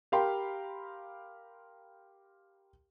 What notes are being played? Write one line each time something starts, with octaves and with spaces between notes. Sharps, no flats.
G4 A#4 F5 G5 B5 C6